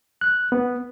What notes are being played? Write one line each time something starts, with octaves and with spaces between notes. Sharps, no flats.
F#6
B3